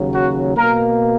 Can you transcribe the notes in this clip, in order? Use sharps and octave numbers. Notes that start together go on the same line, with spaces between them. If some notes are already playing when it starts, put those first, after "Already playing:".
Already playing: D#2 C#3 F#3
F#4
B2 A#3 A#4